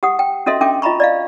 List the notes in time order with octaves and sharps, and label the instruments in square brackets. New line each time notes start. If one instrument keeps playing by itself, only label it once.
[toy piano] G4 F#5 D#6
G5
C#4 F#4 A4 D#5 E5 C6
C#4 D4 A4 E5 G5 D6
F4 D#5 E5 A#5 B5 C#6
D5 D#5 F5